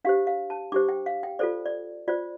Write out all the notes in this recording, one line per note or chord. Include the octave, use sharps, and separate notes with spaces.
D4 G4 C5 F5
F5
A5
D4 G4 C5 D6
G5
F5
G5
F4 A4 C5 D5
D5
F4 C5 D5